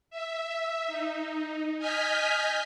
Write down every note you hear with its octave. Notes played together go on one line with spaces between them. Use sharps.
E5
D#4
D#5 G#5 F6 G6 B6